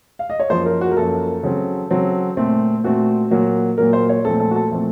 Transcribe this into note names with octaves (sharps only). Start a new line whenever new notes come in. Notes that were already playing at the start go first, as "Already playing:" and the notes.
F5
D#5
C#5
F#2 F3 A#3 C5
A#4
F#4
A#4
F#2 F3 A#3 A4
C#3 F#3 C4
C#3 F#3 C4
A#2 A3 C4
A#2 A3 C4 F#4
A#2 F#3 A#3
A#2 F#3 A#3 A#4
C5
C#5
A#2 F3 A3 C4 A4
A4
F#4
A4
A#2 F3 A3 C4